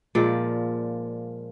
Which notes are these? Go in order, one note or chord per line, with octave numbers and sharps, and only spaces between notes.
A#2 F3 G#3 D5